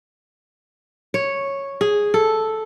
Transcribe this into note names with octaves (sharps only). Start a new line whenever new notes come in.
C#5
G#4
A4